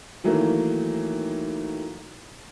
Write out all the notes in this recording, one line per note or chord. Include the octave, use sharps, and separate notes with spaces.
D#3 E3 F#3 A3 A#3